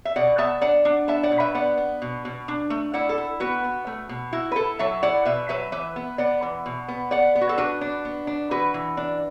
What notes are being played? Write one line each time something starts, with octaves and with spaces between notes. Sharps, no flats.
E5
B2 D5 F#5
B3 E5 A5
D4 D5 F#5
D4
B3 E5 A5
D5 F#5
B2
B4 E5
B3 D5 F#5
B3
B2
B2
D4
A3
E4 D5 F#5
A4
E4
B3 F#4 B4
B3
A3
B2
E4 F#4
B4
E4 A4
F#3 E5 A5
E4 D5 F#5
B2 B4 E5
F#3 B4 E5
E3 B4 E5
B3
B3 D5 F#5
E3
B2
B3
B3 D5 F#5
B3
F#4
A4
D4 F#4 B4
D4
B3
D4
E3 F#4 B4
E3
D4